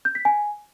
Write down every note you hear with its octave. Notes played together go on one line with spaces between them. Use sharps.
G6
B6
G#5